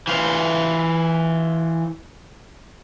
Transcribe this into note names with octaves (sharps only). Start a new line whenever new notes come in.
E3 F4